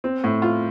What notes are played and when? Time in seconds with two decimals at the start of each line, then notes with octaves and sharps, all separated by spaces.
0.04 C4
0.24 A2
0.42 F4